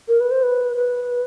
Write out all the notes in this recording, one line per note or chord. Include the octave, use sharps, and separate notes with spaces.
A#4
B4
C5
B4
B4